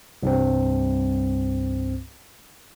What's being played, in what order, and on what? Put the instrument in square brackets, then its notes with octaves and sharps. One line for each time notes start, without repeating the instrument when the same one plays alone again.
[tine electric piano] C2 G2 C4